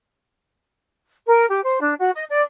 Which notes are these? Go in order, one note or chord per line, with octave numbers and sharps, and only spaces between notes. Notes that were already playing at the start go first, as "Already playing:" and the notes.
A#4
G4
C5
D4
F#4
D#5
D5